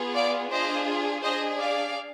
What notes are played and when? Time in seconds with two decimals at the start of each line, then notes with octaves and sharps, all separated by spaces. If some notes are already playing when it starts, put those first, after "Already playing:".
Already playing: B3 F4 G#4
0.15 D5 F5
0.51 D4 F4 G#4 C5 D#5
1.23 D4 G#4 C5 D#5
1.59 D5 F5